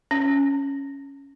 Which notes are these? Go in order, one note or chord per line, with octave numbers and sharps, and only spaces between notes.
C#4